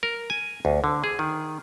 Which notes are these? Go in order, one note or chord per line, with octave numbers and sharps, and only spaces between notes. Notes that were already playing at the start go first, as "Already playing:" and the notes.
A#4
G#5
D2
D3
G#4
D#3